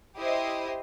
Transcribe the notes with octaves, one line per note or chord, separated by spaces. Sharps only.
E4 G4 C5 D#5